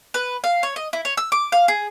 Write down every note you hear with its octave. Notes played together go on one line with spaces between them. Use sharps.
B4
F5
C#5
D#5
E4
C#5
E6
D6
F5
G#4